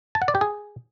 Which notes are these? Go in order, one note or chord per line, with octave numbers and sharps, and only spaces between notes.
A5
F#5
D5
G4
G#4